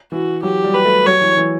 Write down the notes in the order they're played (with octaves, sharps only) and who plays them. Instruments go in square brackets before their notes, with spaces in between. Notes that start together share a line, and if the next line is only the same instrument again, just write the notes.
[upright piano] E3 [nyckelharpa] F#4
[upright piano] F#3 [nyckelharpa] G4
[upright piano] G3
[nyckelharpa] B4
[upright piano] A3
[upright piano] F#3 [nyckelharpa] C#5
[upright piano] E3
E3